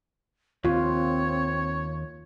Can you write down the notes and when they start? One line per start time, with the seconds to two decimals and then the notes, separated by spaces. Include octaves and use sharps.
0.65 D#2 C4 F4 C#5